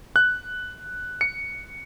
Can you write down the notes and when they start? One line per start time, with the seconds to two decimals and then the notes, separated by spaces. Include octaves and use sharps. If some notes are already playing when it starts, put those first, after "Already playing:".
0.16 F#6
1.21 C#7